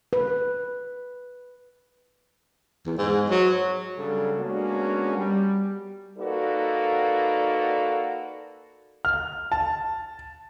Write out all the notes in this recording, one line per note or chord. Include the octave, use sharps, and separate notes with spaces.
B4
E2
G#2
F#3
C#3 F#3 G3 D4 A4
G#3 A#3 B3 C#4 D4 F#4
G3
A#3 D#4 F#4 A4 B4 D5
F6
A5